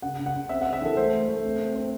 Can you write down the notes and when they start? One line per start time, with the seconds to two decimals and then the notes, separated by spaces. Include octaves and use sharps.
0.02 C#3 F#5
0.19 C#3
0.26 F#5
0.35 C#3
0.49 C4 E5
0.61 F#5
0.65 C4
0.73 E5
0.82 E3 A4
0.97 A3 C5
1.12 A3
1.28 A3
1.44 C4
1.60 C4
1.75 C4